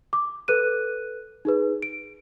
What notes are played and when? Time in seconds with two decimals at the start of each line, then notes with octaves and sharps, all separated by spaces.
0.13 D6
0.48 A4 B4 F#6 D#7
1.45 D#4 G#4 B4
1.82 D7